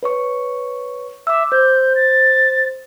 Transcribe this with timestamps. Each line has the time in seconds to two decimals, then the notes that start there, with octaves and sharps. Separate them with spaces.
0.03 B4 C#5 C#6
1.27 E5 D6 E6
1.52 C5 G6
1.96 A6